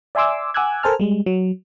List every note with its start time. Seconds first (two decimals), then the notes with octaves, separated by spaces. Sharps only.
0.15 D5 E5 G#5 C6 D6 E6
0.54 F#5 G#5 D6 E6 F#6 G#6
0.83 A4 A#4 C5 G#5 A5 F6
1.00 G3 G#3
1.26 F#3